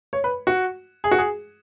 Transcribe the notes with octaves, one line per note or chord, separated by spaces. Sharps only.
C#5
B4
F#4
G#4
F#4
G#4